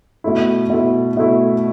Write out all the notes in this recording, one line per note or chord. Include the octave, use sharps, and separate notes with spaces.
B2 A3 E4
B2 A3 E4
B2 A3 E4